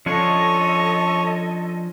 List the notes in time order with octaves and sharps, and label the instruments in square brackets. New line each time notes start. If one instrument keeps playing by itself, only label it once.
[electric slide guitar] F3 C#4 D4 [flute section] A4 D#5 [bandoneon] C#5 C#6